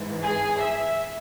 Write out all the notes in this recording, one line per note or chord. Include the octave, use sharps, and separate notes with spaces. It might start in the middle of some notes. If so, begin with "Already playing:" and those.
Already playing: G#2 E3
G#4
E5